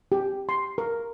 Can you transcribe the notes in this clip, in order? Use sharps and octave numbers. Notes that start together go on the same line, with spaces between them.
G4
C6
A#4